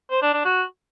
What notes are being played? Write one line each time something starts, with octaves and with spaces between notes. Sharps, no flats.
C5
D4
D4
F#4